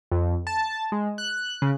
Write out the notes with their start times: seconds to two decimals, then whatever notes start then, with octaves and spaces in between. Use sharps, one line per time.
0.12 F2
0.47 A5
0.92 G#3
1.18 F#6
1.62 C#3